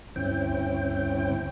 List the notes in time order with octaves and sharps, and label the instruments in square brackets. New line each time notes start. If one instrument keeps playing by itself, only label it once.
[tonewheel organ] D2 G2 C4 C#4 E4 G5